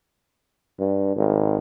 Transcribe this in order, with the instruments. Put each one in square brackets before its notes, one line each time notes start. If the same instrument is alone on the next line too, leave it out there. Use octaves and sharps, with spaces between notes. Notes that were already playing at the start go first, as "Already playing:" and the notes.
[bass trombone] G2
G#1